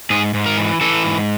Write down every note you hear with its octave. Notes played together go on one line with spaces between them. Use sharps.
G#2 G#4
G#2
A#4
E3
E3 A4
G#2